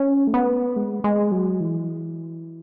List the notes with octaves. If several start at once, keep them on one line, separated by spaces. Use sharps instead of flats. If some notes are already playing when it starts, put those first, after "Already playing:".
Already playing: C#4
A3
B3
G#3
G#3
F#3
E3